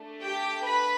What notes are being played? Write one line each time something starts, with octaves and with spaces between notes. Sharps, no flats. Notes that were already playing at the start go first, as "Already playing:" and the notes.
Already playing: A3 D4
G4 G5
B4 B5